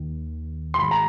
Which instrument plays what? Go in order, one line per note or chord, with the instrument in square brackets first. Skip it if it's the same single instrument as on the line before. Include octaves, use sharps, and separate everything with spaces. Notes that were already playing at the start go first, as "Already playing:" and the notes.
Already playing: [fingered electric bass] D#2 D#3
[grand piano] C6
[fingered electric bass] G#2 D#3 G#3 [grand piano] B5
[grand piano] A#5